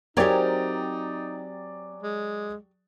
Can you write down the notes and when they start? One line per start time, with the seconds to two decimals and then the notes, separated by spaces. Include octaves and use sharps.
0.17 F#3 C4 D#4 G4 G#4 A#4 C#5 D5
2.03 G#3